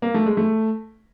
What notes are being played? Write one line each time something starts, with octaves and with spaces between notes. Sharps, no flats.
A#3
A3
G#3
A3